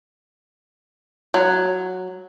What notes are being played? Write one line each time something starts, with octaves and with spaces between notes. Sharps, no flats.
F#3